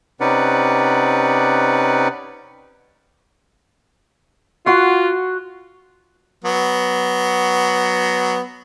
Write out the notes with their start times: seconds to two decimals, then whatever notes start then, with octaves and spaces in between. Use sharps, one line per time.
0.20 C3 C#4 D#4 B4 D5 F#5
4.66 F4 F#4 F#5
6.44 F#3 B3